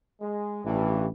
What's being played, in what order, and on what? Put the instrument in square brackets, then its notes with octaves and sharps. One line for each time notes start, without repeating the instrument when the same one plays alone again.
[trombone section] G#3
[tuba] A1 [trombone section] G2 E3